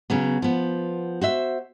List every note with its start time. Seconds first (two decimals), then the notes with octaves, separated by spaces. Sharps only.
0.10 C#3 F#3 B3
0.42 F3 B3
1.21 F#4 C5 E5